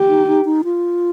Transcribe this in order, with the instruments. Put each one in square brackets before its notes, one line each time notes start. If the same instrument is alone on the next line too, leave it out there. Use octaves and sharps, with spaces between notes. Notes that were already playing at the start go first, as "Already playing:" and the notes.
Already playing: [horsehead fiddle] G4
[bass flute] D#4
D#4
D#4
F4